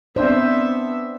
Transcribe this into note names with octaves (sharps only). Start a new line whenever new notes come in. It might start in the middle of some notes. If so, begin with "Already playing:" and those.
B3 C4 D4 C5 D5 E5